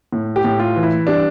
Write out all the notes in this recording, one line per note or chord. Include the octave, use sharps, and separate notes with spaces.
A2
G4
A2
F4
E3
E4
G3 D4